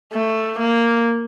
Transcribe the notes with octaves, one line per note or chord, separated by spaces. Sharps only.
A3
A#3